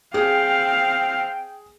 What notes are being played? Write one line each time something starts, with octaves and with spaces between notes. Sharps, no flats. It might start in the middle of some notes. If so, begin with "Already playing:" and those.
C4 G#4 F5 G5